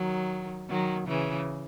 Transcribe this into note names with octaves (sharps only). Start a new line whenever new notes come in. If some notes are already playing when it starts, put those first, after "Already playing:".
Already playing: D#3 F#3
D#3 F#3
C#3 E3